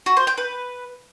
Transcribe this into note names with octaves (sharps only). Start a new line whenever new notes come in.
F#4
C5
G5
B4